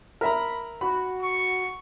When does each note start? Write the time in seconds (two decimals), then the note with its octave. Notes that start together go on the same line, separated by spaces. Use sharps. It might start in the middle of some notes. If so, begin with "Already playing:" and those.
0.21 A#4 E5 A#5 B5
0.81 F#4 B5
1.22 C#6